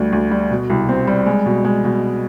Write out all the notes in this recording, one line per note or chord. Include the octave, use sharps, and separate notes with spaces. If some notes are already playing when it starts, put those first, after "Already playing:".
Already playing: D2 G3
D2
G3
B2
C2
C4
G3
G#3
B2
G#3
B2